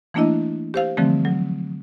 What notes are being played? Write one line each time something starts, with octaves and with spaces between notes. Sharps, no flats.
E3 A3 A#3 D4 E4 D#5
G4 C5 F5
D3 E3 F3 G3 A3 C4
F#3